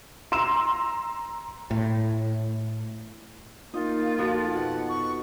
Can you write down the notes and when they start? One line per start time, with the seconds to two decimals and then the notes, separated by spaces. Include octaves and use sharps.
0.32 A#5 C6 E6 E7
1.71 A2
3.74 A#3 D#4 F4
4.18 F2 F3 F#4
4.53 B2 F#5
4.89 C#6